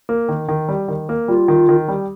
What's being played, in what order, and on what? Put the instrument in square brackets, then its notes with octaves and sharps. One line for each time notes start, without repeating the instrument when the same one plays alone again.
[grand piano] A#3
D#3
D#3
G3
D#3
A#3
[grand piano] G3 [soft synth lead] F4
[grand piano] D#3
D#3
G3